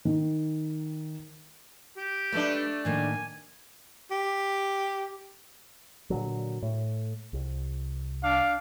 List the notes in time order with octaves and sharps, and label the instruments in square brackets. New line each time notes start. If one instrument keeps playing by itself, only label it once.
[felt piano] D#3
[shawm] G4
[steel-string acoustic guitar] G#3 B4 D5 [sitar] A3 D4
[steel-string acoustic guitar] A2 D#3 A#3 [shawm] G#5
[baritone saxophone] G4
[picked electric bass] A#2 D3 F#3
A2
C2
[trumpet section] D4 F5 D6